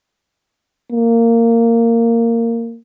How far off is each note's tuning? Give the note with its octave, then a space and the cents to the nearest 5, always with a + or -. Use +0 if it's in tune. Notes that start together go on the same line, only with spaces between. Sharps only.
A#3 -15